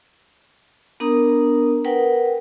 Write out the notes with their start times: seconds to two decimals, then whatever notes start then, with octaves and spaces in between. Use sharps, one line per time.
1.00 B3 D4 A#4 A#5 D#6
1.85 A#4 B4 F#5 G5